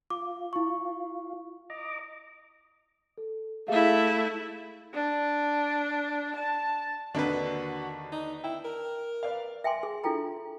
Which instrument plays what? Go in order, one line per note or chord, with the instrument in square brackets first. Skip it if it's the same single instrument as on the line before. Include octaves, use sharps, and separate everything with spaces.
[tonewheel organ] F4 [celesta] D6
[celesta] E4 C#6
[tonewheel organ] D#5 A#5 D6
[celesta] A4
[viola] A3 E4 [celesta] G#4 E5 F5
[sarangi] D4
A5
[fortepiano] D#2 D3 D#3 [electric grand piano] D4 B4 [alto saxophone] F#4
[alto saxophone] D#4
[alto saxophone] E4 [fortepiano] G5
[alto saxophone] A#4
[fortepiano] B4 D5 F5
[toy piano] E5 G5 G#5 C6 D6
G#4
D4 E4 F4 A4 G5 A#5